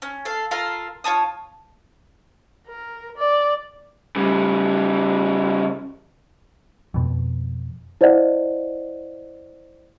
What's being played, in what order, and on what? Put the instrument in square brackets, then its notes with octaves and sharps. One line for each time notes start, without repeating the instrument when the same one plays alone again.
[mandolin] C#4
A4 F5
F4 A4 A#4 F5
F4 C#5 A5 D#6
[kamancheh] A#4
D5
[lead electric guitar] C#3 G3
[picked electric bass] F2 B2
[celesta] E4 C5 D5 D#5 F5 F#5